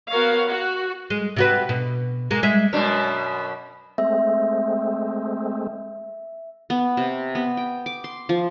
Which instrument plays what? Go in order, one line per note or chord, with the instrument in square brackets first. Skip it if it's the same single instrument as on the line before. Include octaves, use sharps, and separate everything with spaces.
[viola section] B3 F#4 A#4 C#5 F5
F#4
[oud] G#3
C3 F#4 B4
B2
G#3 A#3
G#3 E5
[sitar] F#2 B2 D4
[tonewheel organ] G#3 A3 C4 [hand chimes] E5
[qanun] B3
C3
B3
G5
D6
C6
F3